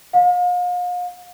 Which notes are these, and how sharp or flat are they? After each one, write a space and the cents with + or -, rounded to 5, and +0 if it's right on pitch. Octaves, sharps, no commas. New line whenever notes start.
F5 +40